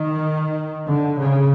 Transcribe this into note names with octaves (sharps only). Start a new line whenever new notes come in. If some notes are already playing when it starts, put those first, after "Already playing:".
Already playing: D#3
D3
C#3